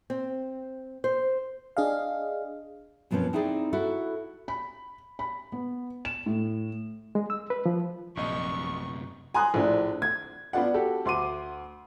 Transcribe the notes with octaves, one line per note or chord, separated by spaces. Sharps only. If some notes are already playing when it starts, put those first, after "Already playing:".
C4
C5
D4 G#4 D#5 F5
F#2 B2 F3 G3 C4 C#4
C4 D#4 E4 G#4 D5
E4 F#4 A4
B5
B5
B3
E7
A2
G#3
E6
B4
F3
A#1 F#2 C3 D#5 C#6
G#5 A#5 C6 D#6 F#6
A#1 A2 D4
G#6
B3 D4 F4 D5 F#5
F#4 G4 A4
D2 C6 D6 D#7